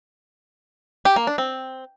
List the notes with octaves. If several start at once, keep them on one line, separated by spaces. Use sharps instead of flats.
G4
A#3
D4
C4